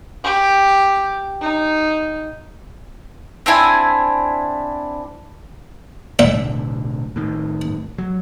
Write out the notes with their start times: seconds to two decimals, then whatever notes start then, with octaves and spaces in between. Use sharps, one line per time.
0.24 G4
1.42 D#4
3.46 C4 D4 E4 G#5
6.19 B1 A2 D3 E5
7.16 A2 D#3
7.98 F#3